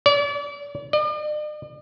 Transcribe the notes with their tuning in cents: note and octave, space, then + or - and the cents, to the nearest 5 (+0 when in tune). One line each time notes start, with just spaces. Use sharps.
D5 -40
D5 +45